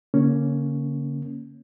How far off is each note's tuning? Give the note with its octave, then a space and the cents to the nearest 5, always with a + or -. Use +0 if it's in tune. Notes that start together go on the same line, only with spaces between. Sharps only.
D3 -40 A#3 +0 C#4 +0